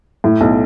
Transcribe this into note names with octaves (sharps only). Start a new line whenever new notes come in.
A2
B1